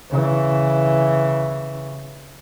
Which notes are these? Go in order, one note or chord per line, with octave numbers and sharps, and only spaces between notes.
C#3 E3